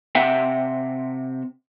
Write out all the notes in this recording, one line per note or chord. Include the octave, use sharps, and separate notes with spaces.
C3 E5 F#5 G5